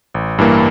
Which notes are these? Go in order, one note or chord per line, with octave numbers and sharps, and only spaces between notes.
A1
G2 E3 A#3